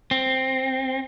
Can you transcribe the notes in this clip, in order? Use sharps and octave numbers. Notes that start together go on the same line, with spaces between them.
C4